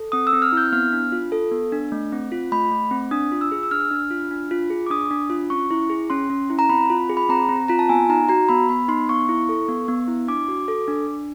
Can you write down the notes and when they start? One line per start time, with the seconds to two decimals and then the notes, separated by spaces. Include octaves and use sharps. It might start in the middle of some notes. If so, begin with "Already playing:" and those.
Already playing: A4
0.12 C4 D#6
0.27 E6
0.33 C4
0.42 F6
0.52 E4 G6
0.72 B3 F6
0.92 D4
1.12 F4
1.32 A4
1.52 B3
1.72 D4
1.92 A3
2.12 C4
2.32 F4
2.52 A3 B5
2.72 A3
2.91 C4
3.11 D4 D#6
3.32 F4
3.41 E6
3.52 G#4
3.63 E6
3.71 D4 F6
3.91 D4
4.11 F4
4.31 D4
4.51 F4
4.70 G#4
4.86 D6
4.90 D4 D#6
5.11 D4
5.30 F4
5.50 C#4 C#6
5.71 E4
5.90 G#4
6.10 C#4 C6
6.30 C#4
6.50 E4
6.59 A#5
6.69 C4 B5
6.90 F4
7.10 G#4
7.17 B5
7.29 C4 A#5
7.49 C4
7.68 F4 A#5
7.79 A5
7.89 B3 G#5
8.10 D#4 A#5
8.29 F#4 A#5
8.49 B3 B5
8.69 B3 B5
8.88 D#4 C6
9.09 B3 C#6
9.29 E4
9.49 A4
9.68 B3
9.88 B3
10.08 E4
10.28 D4 D6
10.48 F#4
10.68 A4
10.88 D4
11.07 D4